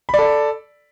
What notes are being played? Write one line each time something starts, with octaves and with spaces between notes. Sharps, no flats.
A4 D5 B5